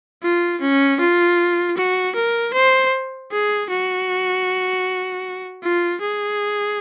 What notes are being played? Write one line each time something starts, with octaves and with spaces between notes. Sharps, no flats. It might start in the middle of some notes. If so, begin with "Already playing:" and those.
F4
C#4
F4
F#4
A#4
C5
G#4
F#4
F4
G#4